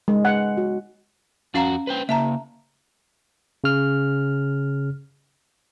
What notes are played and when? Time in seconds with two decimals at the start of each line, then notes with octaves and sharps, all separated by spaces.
0.08 G#3
0.25 F#5
0.57 F#4
1.54 F2 C#4 F#4 F5 A#5
1.87 B4 C5 G5
2.09 C#3 A#3 E5 A5 A#5
3.64 C#3 F6